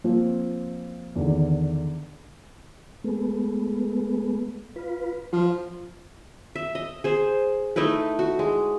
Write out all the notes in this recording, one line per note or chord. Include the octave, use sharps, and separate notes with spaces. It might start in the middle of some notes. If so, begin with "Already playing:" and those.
F3 A#3 C4
E2 D3 D#3
G#3 A3 B3
F4 B4
F3 C5 F5
E5
D#5
G#4 C5
A3 D#4 E4 B4
F#4
G#3